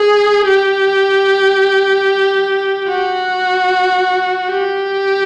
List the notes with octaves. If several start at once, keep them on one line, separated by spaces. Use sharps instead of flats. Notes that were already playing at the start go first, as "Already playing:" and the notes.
Already playing: G#4
G4
F#4
G4